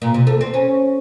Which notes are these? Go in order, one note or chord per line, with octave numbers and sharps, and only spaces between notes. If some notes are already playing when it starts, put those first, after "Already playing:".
A#2
C3
A3
C4
C#4